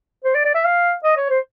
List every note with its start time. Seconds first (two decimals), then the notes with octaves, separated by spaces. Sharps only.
0.24 C5
0.35 D5
0.45 D5
0.55 E5
0.65 F5
1.04 D#5
1.17 C#5
1.30 C5